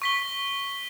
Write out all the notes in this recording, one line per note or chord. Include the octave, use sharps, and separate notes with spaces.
C#6 B6 G7